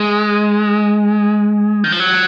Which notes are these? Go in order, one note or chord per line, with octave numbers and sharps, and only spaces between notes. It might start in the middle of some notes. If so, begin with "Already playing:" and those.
Already playing: G#3
D#3
F3
F#3